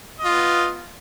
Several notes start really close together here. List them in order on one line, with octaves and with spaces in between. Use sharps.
D#5 F4 B3